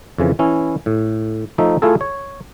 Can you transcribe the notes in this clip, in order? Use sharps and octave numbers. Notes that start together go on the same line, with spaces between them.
F2 C#3 E3
E3 C#4 E4
A2
F3 A3 D#4 E5
A3 E4 F4 G#4 A4
C#5